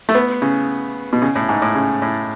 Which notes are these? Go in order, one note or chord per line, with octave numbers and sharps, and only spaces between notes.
A3
B3
C#3
B2
C#3
A2
G#2
A2
C#3
A2